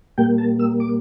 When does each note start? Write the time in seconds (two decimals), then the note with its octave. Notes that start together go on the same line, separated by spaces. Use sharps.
0.18 A#2 G3 A#3 G5
0.38 A5
0.59 E6
0.80 D6